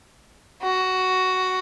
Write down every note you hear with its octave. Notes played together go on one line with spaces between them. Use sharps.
F#4